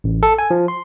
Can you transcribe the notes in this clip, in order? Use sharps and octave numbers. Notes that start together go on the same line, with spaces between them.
A1
A4
G#5
F3
C6